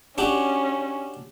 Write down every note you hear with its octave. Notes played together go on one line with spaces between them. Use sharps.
C#4 D4 F#4 G4